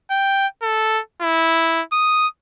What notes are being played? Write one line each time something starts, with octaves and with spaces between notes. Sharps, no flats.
G5
A4
E4
D#6